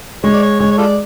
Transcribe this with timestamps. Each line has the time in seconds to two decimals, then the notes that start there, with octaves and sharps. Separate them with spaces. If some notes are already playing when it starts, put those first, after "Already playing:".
0.24 G#3 C#5
0.33 D5
0.42 C#5
0.59 G#3 C#5
0.71 C#5
0.78 F4 A4 D5